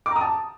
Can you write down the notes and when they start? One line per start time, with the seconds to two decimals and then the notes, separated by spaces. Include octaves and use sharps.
0.06 D6
0.11 A#5
0.16 D#6
0.21 A5